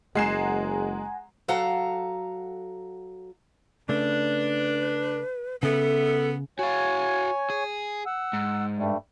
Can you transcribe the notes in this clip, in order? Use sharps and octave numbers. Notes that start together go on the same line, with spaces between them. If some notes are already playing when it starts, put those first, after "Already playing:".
F#1 G#3 F#5 G#5 A#5 C7 E7
F#3 A4 F5 F#5 A#5
C#3 A3 D4 B4
C#3 B3 A4 E5
F#4 C#5 F5 G#5
G#4
F#5 E6
G#2
G2 G3 A3